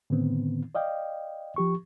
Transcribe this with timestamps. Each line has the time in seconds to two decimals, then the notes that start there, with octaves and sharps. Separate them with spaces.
0.10 A2 D3 D#3 B3 C4
0.75 D5 D#5 F5 G5
1.56 F3 G4 C#6